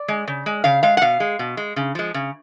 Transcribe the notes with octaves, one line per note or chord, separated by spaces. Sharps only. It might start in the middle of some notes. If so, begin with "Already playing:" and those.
Already playing: D5
G#3
C#3
G#3
C#3 F5
G#3 F5
F#5
B2 F5
G#3
B2
G#3
C#3
F3 G#3
C#3